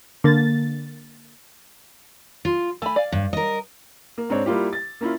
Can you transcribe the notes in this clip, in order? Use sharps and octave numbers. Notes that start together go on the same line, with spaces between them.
D3 A#3 A6
F4
A3 G#5 B5
D5 F5
G2
A#4 D#5
A#3
G#2 C4 D4 C#5
G3 A#3 E4 F4 G4
A6
A#3 C#4 E4 F4